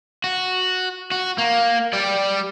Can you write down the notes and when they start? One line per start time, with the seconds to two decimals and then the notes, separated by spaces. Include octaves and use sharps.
0.24 F#4
1.11 F#4
1.38 A#3
1.93 G3 D5